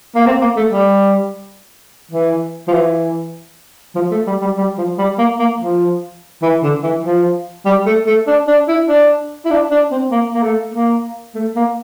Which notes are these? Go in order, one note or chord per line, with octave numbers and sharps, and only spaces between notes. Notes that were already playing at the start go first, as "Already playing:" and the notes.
A#3
C4
A#3
A3
G3
E3
F3
E3
F3
A3
G3
G3
G3
F3
G3
A#3
A#3
F3
E3
D3
E3
F3
G3
A3
A3
D4
D4
E4
D4
E4
D4
D4
C4
A#3
A#3
A3
A#3
A3
A#3